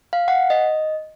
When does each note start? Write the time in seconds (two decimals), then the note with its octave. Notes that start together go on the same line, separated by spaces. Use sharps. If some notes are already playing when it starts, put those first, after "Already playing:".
0.13 F5
0.28 F#5
0.50 D#5